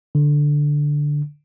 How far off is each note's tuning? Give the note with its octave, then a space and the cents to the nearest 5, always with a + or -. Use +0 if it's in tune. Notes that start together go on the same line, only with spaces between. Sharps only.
D3 +0